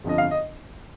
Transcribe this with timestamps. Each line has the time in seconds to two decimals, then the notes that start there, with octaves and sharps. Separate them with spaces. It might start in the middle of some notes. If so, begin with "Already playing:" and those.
0.04 G1 F2 D3 F3 D#5
0.18 F5
0.31 D#5